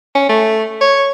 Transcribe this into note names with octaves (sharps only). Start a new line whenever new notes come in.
C#4
A3
C#5